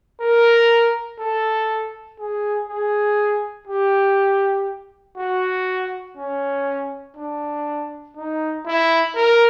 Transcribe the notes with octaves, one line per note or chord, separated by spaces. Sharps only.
A#4
A4
G#4
G#4
G4
F#4
C#4
D4
D#4
E4
A#4